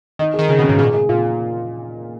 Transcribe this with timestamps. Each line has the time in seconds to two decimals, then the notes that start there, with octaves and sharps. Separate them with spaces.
0.19 D#3 D#4
0.34 G#4
0.39 D#3
0.49 C#3 G#4
0.59 B2
0.64 C#3
0.69 G#2
0.78 A#2 G#4
0.94 G#4
1.09 A#2 F4